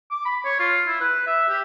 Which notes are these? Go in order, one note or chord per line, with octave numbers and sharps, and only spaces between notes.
D6
B5
C#5
F4
E4
B4
E5
G4